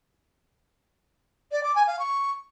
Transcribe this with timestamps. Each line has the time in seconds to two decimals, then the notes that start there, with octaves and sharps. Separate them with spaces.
1.52 D5
1.63 D6
1.75 G#5
1.87 F5
1.99 C#6